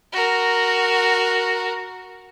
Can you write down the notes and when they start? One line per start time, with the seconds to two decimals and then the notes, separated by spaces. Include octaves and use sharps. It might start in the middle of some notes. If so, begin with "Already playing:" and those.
0.13 F#4 A#4